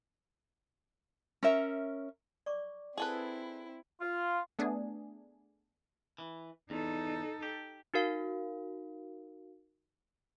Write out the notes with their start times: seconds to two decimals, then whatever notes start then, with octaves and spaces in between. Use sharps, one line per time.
1.43 C#4 A#4 E5
2.46 D5 C#6 D6
2.98 C4 E4 G#4 A4 B4
4.01 F4
4.59 A3 B3 D4 G#4
6.18 E3
6.70 E2 D#4 A4
7.42 G4
7.94 D#4 F#4 A#4 F5